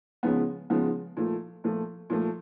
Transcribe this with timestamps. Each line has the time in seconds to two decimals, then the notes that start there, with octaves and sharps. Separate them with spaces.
0.23 C#3 F3 G#3 B3 D#4
0.70 C#3 F3 G#3 B3 D#4
1.17 A#2 F3 A3
1.64 A#2 F3 A3
2.10 A#2 F3 A3